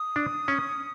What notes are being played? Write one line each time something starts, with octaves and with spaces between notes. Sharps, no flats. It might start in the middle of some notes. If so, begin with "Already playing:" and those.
Already playing: D#6
D4
C#4